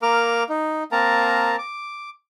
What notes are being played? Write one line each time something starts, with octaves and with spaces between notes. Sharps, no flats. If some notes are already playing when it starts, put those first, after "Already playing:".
A#3 A#4 D6 F6
D#4
A#3 C4 A#4 A5 A#5
D6